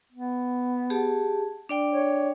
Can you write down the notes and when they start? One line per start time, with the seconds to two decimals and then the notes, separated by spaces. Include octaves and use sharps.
0.12 B3
0.90 G4 G#4 A5
1.69 D4 D5 G5
1.92 C#5